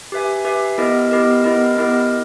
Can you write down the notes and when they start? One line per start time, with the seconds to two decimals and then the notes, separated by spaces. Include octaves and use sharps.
0.12 G4 B4 E5 G#5
0.45 G4 B4 E5 G#5
0.78 B3 E4 G4 A#4 D#5
1.11 B3 E4 G4 A#4 D#5
1.44 B3 E4 G4 A#4 D#5
1.77 B3 E4 G4 A#4 D#5